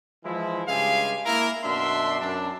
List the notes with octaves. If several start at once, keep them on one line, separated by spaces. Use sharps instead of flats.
E3 F3 G#3 E4
G2 C#3 G#3 G4 F5 G#5
A#3 E4 A#4
F#2 B2 D4 E5 C6
F#2 D4